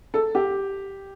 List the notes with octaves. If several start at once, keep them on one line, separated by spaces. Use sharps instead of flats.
A4
G4